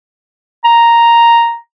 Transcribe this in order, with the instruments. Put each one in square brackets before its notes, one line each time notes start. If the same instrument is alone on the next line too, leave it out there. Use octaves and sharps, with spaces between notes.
[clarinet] A#5